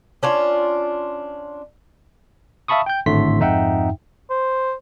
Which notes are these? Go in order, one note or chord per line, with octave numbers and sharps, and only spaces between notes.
C#4 D4 F4
E5 F5 A5 B5 C#6 D#6
G5 G6
G#1 A2 D3 A3 C6 B6
F2 G#2 D#4 E5 F#5 G5
C5